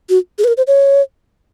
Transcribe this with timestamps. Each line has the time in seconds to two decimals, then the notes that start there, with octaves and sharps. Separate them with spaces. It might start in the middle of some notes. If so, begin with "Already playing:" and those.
0.10 F#4
0.39 G#4
0.44 B4
0.48 A#4
0.57 C5
0.67 C#5